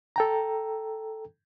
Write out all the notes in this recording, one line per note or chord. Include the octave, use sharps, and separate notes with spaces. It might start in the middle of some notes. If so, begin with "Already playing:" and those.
A4 G5 A#5